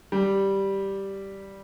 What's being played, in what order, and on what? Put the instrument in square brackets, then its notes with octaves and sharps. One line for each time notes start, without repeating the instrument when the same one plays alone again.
[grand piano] G3